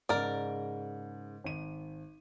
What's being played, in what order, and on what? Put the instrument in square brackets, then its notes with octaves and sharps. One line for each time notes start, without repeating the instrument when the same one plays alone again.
[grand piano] G#2 C#3 [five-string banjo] A#4 D5
[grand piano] G#1 D#7